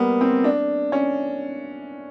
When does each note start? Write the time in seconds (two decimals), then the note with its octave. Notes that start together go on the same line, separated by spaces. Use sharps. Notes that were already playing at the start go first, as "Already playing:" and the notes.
Already playing: G3 A#3 B3
0.21 C4
0.44 D4
0.92 C#4